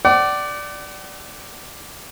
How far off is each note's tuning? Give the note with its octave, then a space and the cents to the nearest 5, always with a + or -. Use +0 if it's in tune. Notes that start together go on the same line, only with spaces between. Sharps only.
D5 +0 F#5 +45